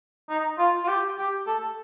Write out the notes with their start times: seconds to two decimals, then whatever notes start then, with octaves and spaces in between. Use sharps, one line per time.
0.29 D#4
0.58 F4
0.84 F4
0.88 G4
1.18 G4
1.47 A4